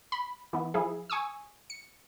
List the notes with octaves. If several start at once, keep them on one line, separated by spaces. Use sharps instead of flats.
B5
E3 B3
F3 E4 G#4
G#5 C#6 D#6 E6
C#7